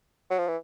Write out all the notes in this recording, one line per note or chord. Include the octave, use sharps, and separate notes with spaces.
F#3
F3
E3